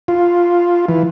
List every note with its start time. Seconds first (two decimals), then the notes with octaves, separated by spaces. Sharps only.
0.08 F4
0.89 E3